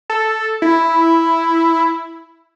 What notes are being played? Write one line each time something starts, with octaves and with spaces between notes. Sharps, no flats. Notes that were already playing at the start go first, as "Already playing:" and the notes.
A4
E4